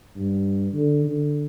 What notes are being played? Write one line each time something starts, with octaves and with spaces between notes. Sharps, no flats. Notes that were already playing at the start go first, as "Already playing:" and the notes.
G2
D3
D3